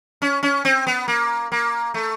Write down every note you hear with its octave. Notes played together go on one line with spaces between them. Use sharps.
C#4
C#4
C4
B3
A#3
A#3
A3